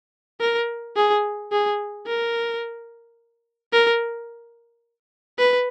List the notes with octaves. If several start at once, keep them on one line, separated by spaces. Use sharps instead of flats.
A#4
G#4
G#4
A#4
A#4
B4